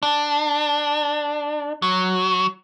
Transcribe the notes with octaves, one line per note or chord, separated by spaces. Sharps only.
D4
F#3